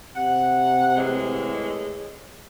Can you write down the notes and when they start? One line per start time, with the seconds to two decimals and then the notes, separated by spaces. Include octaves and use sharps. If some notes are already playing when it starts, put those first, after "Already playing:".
0.16 C3 F#5
0.97 A2 E3 G#3